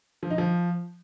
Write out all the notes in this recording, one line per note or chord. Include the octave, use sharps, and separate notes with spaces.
F3
D#4
F3